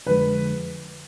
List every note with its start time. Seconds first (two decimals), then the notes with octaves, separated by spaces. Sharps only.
0.06 F2 D3 F3 G#3 B4